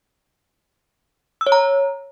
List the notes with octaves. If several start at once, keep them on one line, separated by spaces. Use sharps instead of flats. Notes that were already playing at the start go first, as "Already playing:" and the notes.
E6
C#5
A#5